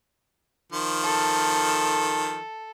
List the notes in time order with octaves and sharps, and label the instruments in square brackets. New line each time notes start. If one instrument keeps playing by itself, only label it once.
[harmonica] D#3 F3
[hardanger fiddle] A4